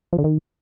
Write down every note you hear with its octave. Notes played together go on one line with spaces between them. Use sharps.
F3
D3
D#3